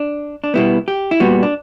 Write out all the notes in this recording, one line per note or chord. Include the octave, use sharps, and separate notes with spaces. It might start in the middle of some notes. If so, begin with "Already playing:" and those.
Already playing: D4
D4
B2 G3 B3 E4
G4
E4
A#2 G3 B3 F#4
D4